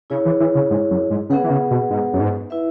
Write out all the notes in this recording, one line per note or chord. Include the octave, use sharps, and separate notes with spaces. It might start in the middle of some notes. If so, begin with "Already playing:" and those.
C#3 E4 G#4 C#5
E3
E3
C#3
G#2
F#2
G#2
C#3 B3 G#4 B4 F#5
E3
C#3
B2
G#2
F#2
G#2
E4 B4 E5